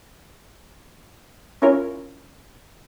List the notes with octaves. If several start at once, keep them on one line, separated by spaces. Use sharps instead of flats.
C#4 E4 F4 A#4 C#5